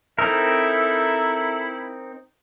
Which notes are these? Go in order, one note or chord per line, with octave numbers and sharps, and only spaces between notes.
C4 D#4 E4 A4 A#4 E5